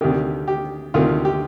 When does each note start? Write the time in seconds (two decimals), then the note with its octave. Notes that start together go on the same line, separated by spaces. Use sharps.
0.01 D2 C3 D#3 G4
0.48 G4
0.94 D2 C3 D#3 F4
1.25 G4